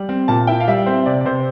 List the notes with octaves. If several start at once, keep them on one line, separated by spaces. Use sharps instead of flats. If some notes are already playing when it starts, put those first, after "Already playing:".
Already playing: G3
C4
A#2 A5
E4 G5
F5
G3 E5
C4 C5
C3 D5
D5
C3 C5